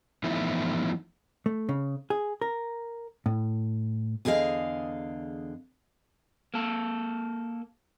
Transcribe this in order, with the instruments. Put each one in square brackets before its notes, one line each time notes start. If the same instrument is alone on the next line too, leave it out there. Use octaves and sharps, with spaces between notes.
[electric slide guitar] E3 F3 A3 B3 D#4 E4
[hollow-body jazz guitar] A3
C#3
G#4
A#4
A2
[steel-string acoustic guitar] E2 D3 G#4 D#5 F5
[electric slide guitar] A#3 A4